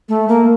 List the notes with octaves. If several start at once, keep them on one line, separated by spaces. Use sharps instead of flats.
A3
A#3